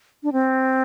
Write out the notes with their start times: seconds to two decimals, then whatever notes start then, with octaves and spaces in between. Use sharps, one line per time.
0.23 D4
0.33 C4